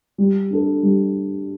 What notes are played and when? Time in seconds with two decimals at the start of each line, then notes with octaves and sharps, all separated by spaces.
0.18 G3
0.50 D4 A4
0.83 G3